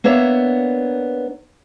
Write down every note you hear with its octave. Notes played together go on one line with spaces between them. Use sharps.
A#3 B3 D4 C#5 E5